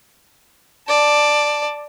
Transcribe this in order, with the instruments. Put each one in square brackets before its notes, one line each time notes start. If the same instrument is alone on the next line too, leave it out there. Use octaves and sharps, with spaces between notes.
[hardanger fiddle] D5 A5